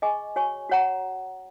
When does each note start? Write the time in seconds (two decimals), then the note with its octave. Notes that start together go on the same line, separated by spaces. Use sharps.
0.02 G#4 D#5 G#5 C#6
0.36 F#4 C#5 G#5 C#6
0.70 F#4 C#5 F#5 A#5